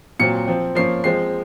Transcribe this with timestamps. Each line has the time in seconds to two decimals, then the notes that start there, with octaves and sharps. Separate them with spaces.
0.20 A#2 F#3 C4 C#7
0.47 F3 C4
0.75 F3 A#3 C#4 C7
1.04 F3 G#3 C4 C7